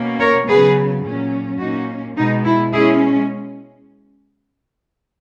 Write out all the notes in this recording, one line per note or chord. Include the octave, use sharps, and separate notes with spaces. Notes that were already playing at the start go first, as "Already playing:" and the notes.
Already playing: B2 A#3 C#4
A#4 C#5
C#3 F#3 B3 G#4 B4
A#2 F#3 C#4
A#2 A#3 C#4 D#4 F#4
B2 G#3 B3 D#4
E4
B2 G#3 C#4 E4 G#4